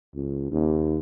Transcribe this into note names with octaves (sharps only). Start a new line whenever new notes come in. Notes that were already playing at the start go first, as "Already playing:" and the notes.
C#2
D#2